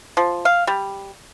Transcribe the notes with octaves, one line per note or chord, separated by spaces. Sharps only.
F3
F5
G3